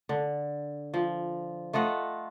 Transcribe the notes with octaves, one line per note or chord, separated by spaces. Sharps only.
D3
F3
A3 F4 D#5 F#5